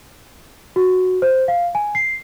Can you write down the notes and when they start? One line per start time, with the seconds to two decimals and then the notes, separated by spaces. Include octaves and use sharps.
0.76 F#4
1.22 C5
1.48 F5
1.75 G#5
1.95 C7